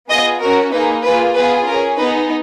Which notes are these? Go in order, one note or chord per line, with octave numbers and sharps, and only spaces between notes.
B3 F4 G#4 D#5
C#4 F#4 A#4
A#3 D#4 G#4 B4
A#3 F4 G#4 B4
B3 F4 G#4 B4
C#4 G#4 A#4
B3 D#4 G#4 B4